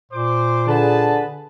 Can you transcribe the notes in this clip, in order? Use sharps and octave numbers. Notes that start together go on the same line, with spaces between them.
A#2 C5 D6
D3 G#4 B4 A5